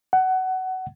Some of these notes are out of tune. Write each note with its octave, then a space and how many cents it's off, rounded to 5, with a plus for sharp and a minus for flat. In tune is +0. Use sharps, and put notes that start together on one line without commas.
F#5 +20